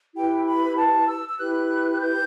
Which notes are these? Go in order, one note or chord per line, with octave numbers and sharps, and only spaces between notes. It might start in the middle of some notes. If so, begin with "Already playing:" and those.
E4 G4 B4 G5
B5
A5
E6
E6
E4 G4 B4 F#6
G6